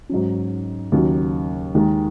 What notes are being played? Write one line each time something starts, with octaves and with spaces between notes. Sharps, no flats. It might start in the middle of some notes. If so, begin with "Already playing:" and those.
G#2 F#3 C#4
D#2 C#3 F#3
D#2 D#3 G#3